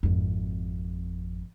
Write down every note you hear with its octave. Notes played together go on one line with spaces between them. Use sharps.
G#1 F2